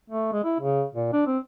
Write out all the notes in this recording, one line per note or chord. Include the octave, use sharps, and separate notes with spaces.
A3
G#3
E4
C#3
A#2
D4
C4